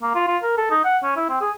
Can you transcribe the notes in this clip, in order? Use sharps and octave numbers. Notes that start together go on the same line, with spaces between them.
A#3
F4
F4
A#4
A4
D#4
F#5
C#4
E4
C4
G#4